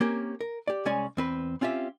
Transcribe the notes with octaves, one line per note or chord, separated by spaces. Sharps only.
A#3 C4 C#4 G4 A#4
A#4
G4 D5
C2 G#3 C#4 C#5 D5 G#5
E2 C4 B4
C4 C#4 F4 G4 E5